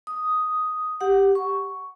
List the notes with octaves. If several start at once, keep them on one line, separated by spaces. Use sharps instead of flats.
D#6
G4 F#5
C#6